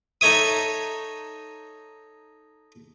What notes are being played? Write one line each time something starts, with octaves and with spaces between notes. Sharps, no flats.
D#4 A4 C#5 E5 D#6